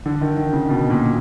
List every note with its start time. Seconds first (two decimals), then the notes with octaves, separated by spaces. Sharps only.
0.06 D3
0.21 D#3
0.37 D#3
0.53 C#3
0.69 B2
0.90 A#2